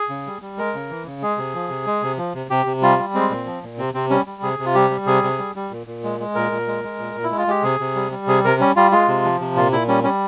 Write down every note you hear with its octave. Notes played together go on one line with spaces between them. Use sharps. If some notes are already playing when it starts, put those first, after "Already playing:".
Already playing: G#4
C#3
G3
G3
G#3 A#4
C#3
E3
C#3
G#3 G#4
C3
F3
C3
G#3
C3
F3
C3
C3 G4
C3
G3 F4
G3
G#3 C4
A#2
F3
A#2
C3 C4
C3 C4
G3 C#4
G3
C3 G#4
C3
F4
G3 G4
G3
C3 G#4
C3
G3
G3
A#2
A#2
G#3
G#3
A#2 A#4
A#2
G#3
G#3
A#2
A#2
E4
G#3
F4
G#3 G4
C3 G#4
C3
G3
G3
C3 G#4
C3 A#4
G3 C#4
G3 F4
G#3 F4
C3
F3
C3
A#2 F4
A#2 E4
G3 C#4
G3 C#4